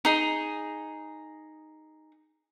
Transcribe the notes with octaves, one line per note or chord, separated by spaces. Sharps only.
D#4 G#4